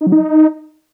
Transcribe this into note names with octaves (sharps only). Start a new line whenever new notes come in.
D#4
F#3
D#4